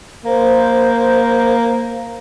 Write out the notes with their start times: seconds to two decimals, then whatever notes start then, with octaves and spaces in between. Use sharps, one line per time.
0.25 A#3 C5